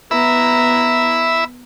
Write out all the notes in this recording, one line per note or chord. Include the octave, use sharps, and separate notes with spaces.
B3 E5 A#5 B5 E6